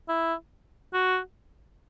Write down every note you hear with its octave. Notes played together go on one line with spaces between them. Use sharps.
E4
F#4